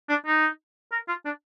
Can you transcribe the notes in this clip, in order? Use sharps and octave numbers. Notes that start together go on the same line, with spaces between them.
D4
D#4
A#4
F4
D4